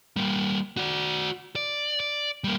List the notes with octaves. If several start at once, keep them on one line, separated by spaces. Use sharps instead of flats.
G3 A#3
F#4 D5
D5
D5
G3 A#3